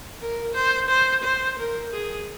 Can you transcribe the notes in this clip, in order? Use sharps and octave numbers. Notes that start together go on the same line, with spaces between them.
A#4
C5
C5
C5
A#4
G#4